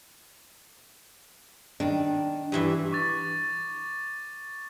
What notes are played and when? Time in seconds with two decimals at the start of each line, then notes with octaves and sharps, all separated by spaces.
1.80 D#3 D4
2.52 G2 E3 E5
2.92 C#6 D6 A6